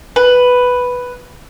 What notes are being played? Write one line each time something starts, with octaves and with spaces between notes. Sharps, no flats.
B4